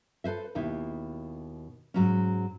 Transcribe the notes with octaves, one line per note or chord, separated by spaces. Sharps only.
A4 B4 C5 E5
D#2 B2 D#4 E4
G#2 F#3 C#4